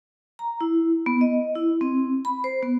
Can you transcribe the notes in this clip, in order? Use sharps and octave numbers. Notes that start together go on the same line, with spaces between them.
A#5
E4
B3
D#5
E4
C4
B5
C5
B3